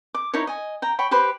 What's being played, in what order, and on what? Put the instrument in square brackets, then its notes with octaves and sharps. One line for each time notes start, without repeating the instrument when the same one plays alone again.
[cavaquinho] D6
D#4 E4 A#4 C#5
D#5 G#5
G5 A#5
C#5 G5 B5
G4 B4 C5 B5